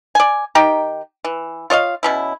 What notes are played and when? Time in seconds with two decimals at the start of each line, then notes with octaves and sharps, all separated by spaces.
0.15 D5 G#5
0.55 D#3 D#4 G4 G5
1.24 E3
1.70 F4 C#5 D#5 F5
2.03 B2 C#4 E4